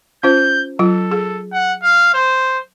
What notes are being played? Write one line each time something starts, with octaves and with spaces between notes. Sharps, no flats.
C#4 F4 C5 G6
F#3 F4 A4
G#4
F#5
F5
C5